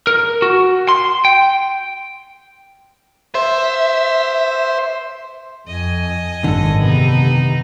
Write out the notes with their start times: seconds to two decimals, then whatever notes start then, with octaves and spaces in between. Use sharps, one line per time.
0.07 A#4
0.42 F#4
0.89 C6
1.25 G5
3.35 C5 E5
5.68 F2 D#5 G#5
6.44 G#1 F#2 D3 D#3 A4
6.80 C3 B3 D#4